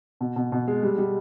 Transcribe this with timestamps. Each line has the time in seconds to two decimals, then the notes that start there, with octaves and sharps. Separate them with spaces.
0.21 B2
0.36 B2
0.52 B2
0.68 G#3
0.83 G3
0.98 G3